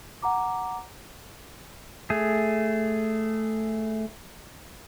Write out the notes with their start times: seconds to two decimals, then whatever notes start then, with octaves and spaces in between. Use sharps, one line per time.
0.22 F#5 A#5 D6
2.10 A3 G#4